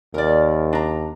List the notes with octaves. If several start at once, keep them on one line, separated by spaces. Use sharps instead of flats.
D#2 A#4 D5
D4 A#5